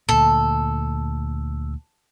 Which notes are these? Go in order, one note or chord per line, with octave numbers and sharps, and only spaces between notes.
D2 A#2 A4